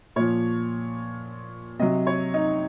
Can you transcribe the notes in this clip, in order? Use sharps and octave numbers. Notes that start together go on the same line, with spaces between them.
A#2 F3 C#5
C3 F#3 D#5
C#5
D#4